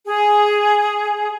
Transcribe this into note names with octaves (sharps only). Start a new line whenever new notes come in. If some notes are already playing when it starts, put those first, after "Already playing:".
G#4